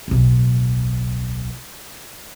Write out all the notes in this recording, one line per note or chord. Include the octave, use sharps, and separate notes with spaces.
D1 B1